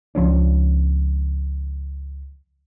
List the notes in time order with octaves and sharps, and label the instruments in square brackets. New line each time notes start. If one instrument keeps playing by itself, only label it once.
[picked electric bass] C#2 F3 C#4 D4